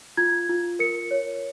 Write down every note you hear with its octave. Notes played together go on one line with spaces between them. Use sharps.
F4 G#6
F4
A#4 C#7
C#5